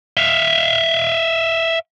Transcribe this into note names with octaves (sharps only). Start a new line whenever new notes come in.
E5 F5